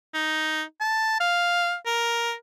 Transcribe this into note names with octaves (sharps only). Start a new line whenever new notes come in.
D#4
A5
F5
A#4